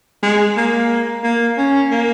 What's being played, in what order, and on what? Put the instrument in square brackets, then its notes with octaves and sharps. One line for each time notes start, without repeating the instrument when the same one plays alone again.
[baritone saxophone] G#3
A#3
A#3
C#4
A#3